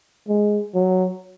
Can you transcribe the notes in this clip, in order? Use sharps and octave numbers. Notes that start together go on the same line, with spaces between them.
G#3
F#3